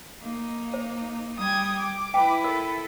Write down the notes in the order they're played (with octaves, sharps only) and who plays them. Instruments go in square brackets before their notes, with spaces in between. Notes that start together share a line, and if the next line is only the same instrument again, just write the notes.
[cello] A#3 D#4
[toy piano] C5
[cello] G3 G5 [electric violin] D#6 G#6
[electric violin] D6
[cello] E4 B4 [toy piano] G5
[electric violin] A4 [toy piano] A#4